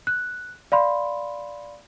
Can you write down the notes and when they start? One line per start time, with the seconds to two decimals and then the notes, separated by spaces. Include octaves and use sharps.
0.07 F#6
0.72 D5 F5 B5 C6